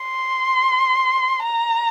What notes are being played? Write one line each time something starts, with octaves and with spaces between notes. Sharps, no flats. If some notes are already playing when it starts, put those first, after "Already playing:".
Already playing: C6
A#5